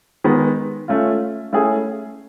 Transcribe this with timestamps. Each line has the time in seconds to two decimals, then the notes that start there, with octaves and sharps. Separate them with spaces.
0.24 D#3 G#3 B3
0.88 A3 C#4 F4
1.53 A3 C#4 E4 G#4